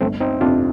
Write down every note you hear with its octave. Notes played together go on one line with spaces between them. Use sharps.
G1 A3 C4
C4 D#4
F2 C3 D4 F4